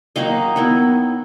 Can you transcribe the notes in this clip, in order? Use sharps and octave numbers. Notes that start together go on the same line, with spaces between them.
D#3 F#3 A#3 D#4 D#5 F5
D#3 F#3 B3 E4